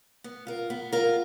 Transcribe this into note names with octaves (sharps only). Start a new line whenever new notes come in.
B3
F4 A#4
B3
F4 A#4